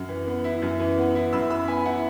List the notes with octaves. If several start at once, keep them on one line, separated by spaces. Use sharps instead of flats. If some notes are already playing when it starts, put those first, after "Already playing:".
Already playing: F#2
E3
B3
E4
F#2
E3
B3
E4
F#2 B5 E6
E3 B5 E6
B3 E5 G#5
E4 F#5